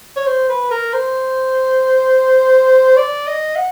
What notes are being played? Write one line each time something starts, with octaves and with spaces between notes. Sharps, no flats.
C#5
C5
B4
A#4
C5
D5
D#5
F#5